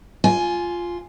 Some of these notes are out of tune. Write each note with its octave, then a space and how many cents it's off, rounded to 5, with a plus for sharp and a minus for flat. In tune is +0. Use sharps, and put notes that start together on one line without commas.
F4 +0 G#5 +15